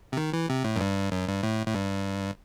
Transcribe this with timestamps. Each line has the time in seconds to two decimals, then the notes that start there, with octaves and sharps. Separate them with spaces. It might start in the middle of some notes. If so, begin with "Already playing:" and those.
0.12 C3
0.17 D#3
0.33 E3
0.50 C3
0.64 A2
0.76 F#2
0.81 G2
1.12 F#2
1.28 G2
1.43 A2
1.67 A2
1.75 G2